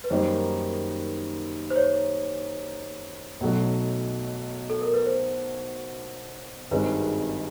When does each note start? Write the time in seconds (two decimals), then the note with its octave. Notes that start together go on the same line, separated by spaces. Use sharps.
0.04 B4
0.10 F#2 D#3 G3 A#3 D#4 C5
1.70 C5
1.76 C#5
3.40 B1 B2 F#3 A3
4.70 A4
4.81 A#4
4.94 B4
5.06 C5
6.71 G#1 G2 D#3 G#3 C4 B4